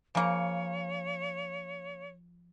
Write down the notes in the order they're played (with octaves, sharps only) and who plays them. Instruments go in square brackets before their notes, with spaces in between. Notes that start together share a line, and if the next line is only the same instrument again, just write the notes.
[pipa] C#3 A#3 [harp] F3 C#7 D7 [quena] C#5